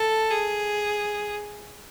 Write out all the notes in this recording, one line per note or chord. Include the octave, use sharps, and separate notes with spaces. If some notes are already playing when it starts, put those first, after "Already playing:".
Already playing: A4
G#4